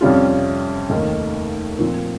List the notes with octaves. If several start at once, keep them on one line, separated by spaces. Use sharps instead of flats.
F2 C3 G3 C#4 F4
F1 D#2 D#3 A#3 D#4
A#2 F3 C4